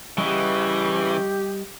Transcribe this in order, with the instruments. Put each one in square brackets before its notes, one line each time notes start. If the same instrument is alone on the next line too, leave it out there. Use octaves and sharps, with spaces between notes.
[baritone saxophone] C#3 [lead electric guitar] E3 [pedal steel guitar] G3 D#5 F#5 [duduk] G4